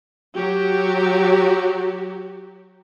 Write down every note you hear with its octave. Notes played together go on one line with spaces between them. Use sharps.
F#3 F#4 G4